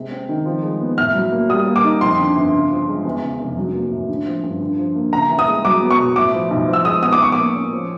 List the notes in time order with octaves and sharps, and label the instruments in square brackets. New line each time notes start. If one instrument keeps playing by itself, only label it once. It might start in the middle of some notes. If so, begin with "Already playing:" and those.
Already playing: [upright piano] C3 G#3
C4
D#3
F3
G#3
B3
[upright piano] A2 [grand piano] F6
[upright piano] F#3
A#3
[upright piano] G3 [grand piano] D#6
[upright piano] A#3
[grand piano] D6
[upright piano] D#4
[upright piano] F2 [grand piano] C6
[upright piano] D3
G1
C#3
F3
G#3
E2
C#3
F1
F#3
A#3
A2
D3
F3
G2
D3
F3
A#3
[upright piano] C#3 [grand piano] A#5
[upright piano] E3
[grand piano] D#6
[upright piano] G#3
[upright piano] F#3 [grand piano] D6
[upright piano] B3
[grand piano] C#6
[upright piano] B2
[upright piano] A2 [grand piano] D6
[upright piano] F3
B1
F3
[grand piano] E6
[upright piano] G#3 [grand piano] D#6
[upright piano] B3 [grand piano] D#6
[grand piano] D6
[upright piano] F3 [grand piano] C#6
[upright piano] A#3 [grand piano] D6
[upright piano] C#4
F3